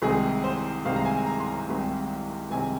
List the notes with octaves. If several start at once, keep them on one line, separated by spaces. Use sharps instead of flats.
C2 C3 D#3 G#3 G#4
C5
C2 C3 D#3 G#3 F5
A#5
G#5
A#5
C6
A#5
C2 C3 D#3 G#3
C2 C3 D#3 G#3 G#5